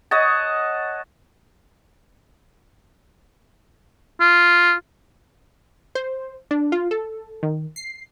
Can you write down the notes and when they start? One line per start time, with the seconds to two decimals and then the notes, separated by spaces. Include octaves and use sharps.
0.11 C#5 D#5 F#5 A5
4.20 F4
5.95 C5
6.51 D4
6.72 F4
6.91 A4
7.43 D#3
7.76 C7